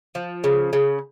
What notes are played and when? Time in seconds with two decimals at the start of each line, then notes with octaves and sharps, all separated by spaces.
0.15 F3
0.44 C#3
0.73 C#3